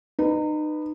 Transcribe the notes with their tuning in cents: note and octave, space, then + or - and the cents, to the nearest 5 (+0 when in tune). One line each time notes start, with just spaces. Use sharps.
D#4 -30 B4 +0